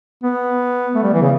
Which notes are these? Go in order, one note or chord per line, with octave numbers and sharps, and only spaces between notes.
B3
A3
G3
E3
C#3